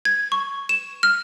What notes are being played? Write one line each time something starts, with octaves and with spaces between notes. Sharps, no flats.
G#6
C#6
E7
F6